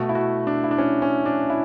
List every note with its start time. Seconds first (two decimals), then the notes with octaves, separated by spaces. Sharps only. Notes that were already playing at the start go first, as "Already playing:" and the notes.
Already playing: B2 A3 F#4
0.09 E4
0.15 F#4
0.47 D4
0.64 E4
0.71 D4
0.78 C#4
1.02 C#4
1.26 D4
1.50 E4